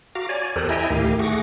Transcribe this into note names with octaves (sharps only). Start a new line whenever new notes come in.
F#4 F5 A#5 D6
C#5 D5 G#5
E2 G4 A4 A#4 C5 F#6
E4 D#5 E5 G5 G#5 A#5
D2 A2 D#3 G4 F5
A3 G#4 F#5 C#6 D6 A#6